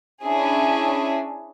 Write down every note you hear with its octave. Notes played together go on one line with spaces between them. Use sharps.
C#4 D4 E4 G#4 E5